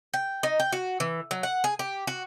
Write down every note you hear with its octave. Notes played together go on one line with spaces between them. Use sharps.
G5
D#4
G5
F#4
E3
F#3
F#5
G#4
G4
F#4